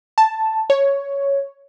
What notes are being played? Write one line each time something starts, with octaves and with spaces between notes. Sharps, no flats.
A5
C#5